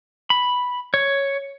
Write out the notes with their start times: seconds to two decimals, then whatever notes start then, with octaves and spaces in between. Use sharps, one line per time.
0.30 B5
0.94 C#5